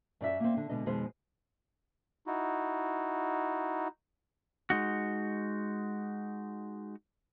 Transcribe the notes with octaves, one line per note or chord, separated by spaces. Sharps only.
F#2 D5 E5
A#3 C4
D3
B2 D3 G#3 D#5
F2 B2 D#3 G#3 G#4 C5
D#4 E4 F#4
G#3 D#4 F#4